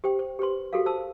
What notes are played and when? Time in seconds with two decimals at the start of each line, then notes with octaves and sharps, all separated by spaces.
0.04 G4 C5 G5
0.19 C5
0.39 G4 B4 C5 C6
0.73 F#4 G4 A4 A#4 F5
0.86 C5 A5 E6